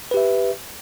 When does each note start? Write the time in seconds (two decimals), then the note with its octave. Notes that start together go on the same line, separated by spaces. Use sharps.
0.11 B4
0.14 G4
0.17 E5